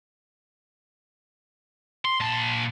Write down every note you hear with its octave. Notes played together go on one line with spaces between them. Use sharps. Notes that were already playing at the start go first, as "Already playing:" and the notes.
C6
A#2 A5